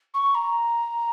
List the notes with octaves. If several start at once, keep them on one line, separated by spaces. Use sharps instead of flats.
C#6
A#5